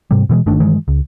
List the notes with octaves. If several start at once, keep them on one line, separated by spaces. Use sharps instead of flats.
G#2 C3 G3
B2 E3 G3 G#3
G1 D#3 A3 D4
G2 D#3 E3 G#3
C#2